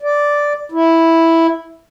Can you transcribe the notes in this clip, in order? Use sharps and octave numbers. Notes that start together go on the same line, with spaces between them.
D5
E4